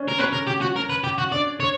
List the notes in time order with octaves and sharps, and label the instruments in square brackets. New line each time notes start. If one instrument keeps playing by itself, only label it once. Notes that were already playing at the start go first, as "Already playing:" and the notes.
Already playing: [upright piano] C#4 D4
[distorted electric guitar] A#4
[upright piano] C#4 [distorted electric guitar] B4
[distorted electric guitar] A#4
G4
F#4
A#4
B4
G4
F#4
[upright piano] D4 [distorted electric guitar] D5
[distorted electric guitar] C#5